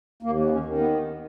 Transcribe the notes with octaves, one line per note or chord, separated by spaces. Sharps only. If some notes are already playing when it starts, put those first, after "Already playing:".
D#2 A#3
B3
C#4
D#3
B3